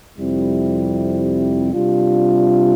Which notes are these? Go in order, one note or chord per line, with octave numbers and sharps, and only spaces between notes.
F2 C3 G3 C4 E4
C3 G3 D4 F4